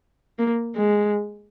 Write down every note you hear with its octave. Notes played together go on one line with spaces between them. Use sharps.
A#3
G#3